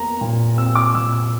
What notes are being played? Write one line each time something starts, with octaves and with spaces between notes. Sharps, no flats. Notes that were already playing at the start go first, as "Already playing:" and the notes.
Already playing: E2 A#3 A#5
A#2
C4 E6
D6
A#2 E6
E6